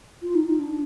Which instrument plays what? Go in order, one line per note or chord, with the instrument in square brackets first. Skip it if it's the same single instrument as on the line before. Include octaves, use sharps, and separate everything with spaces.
[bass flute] F4
D#4
D#4
D4